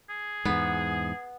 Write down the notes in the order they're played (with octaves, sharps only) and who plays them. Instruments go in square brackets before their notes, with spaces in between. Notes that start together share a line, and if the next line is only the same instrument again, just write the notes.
[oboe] G#4
[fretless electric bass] E2 G#2 [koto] B3